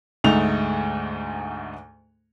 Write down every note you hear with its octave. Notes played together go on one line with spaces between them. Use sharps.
D2 G#2 A3 D#4 F7